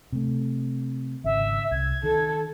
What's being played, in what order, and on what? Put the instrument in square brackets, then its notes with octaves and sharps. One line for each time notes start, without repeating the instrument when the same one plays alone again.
[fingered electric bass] C3 A3
[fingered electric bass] G#1 C#3 [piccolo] E5
[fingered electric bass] C2 [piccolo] G#6
[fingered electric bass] D#3 [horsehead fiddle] A4